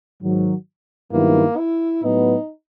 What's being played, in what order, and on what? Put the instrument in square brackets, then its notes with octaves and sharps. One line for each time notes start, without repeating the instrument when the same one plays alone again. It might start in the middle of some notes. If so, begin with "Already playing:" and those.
[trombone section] G#2 D#3 F#3
[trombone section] G2 D#3 F#3 B3 E4 [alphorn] A#3
[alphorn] E4
[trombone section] A2 F#3 B3 [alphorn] D#4